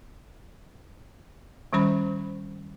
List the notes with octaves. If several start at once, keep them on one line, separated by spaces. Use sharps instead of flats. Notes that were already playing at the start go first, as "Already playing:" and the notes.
D#3 G3 C#4 C5 B5